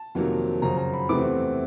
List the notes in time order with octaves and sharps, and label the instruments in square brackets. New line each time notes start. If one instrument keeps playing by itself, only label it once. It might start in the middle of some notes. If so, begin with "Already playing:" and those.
Already playing: [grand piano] A5
F2 C3 D#3 F#3 A#3
F#2 C#3 F3 A#5
A#5
B5
E2 C3 E3 A3 C4 D6